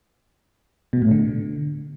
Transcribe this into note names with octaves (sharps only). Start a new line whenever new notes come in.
B2
A2
D3